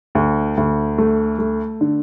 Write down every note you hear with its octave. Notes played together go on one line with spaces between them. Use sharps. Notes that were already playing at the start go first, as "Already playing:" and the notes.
D2
D2
A3
A3
D3